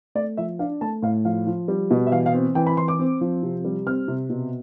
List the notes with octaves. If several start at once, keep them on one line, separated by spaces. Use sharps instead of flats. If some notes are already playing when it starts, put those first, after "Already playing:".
A3 D5
F3 E5
D4 F5
A3 A5
A2 F5
F3 F5
F3
G3
B2
E5
E3 F5
F5
C4
E3 G5
B5
E3 C6
D6
C4
F3
C3
G3
C4 F6
C3
B2